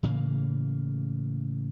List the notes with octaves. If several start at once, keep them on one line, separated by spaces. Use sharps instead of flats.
A2 C#3 E3 A#3